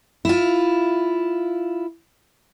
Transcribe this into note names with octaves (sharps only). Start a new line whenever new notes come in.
E4 F4